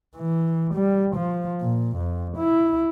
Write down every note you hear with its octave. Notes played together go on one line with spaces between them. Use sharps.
E3
G3
F3
A#2
F2
E4